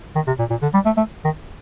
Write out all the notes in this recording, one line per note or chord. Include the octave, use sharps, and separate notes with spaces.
D#3
C3
A#2
A#2
D3
G3
A3
A3
D#3